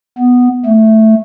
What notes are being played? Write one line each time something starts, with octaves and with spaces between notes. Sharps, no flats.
B3
A3